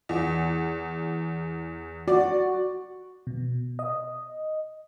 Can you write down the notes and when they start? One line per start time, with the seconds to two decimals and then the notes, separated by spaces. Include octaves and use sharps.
0.09 E2
2.08 F#4 D5
3.27 B2
3.79 D#5